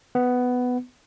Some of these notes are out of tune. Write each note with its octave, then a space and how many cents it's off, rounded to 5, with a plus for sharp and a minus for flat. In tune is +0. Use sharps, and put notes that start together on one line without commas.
B3 +10